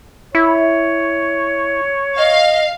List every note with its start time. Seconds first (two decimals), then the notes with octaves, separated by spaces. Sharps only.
0.35 E4 C#5
2.18 D#5 F5